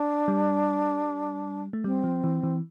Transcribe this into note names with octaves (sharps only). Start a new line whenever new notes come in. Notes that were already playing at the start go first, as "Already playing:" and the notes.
Already playing: D4
G3
A3
G3 C4
F3
E3
E3